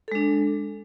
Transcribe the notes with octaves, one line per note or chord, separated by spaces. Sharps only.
G#3 D4 A4